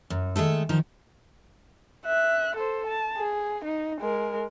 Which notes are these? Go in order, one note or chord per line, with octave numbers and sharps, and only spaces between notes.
F#2
D#3 G#3 A3 A4
D#3 F3 D#4
E5 F#6
A4 C5
A5
G#4
D#4
G#3 A#4